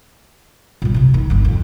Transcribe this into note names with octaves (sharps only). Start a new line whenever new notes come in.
A#2 G3
F2 C3
D#3
G1 G2
F2